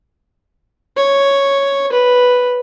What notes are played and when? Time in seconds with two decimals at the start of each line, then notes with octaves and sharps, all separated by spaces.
0.97 C#5
1.92 B4